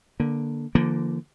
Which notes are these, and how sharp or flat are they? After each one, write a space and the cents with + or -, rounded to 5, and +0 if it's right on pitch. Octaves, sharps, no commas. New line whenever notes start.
D3 +0 A#3 +20
D3 +0 F3 -40 A#3 +0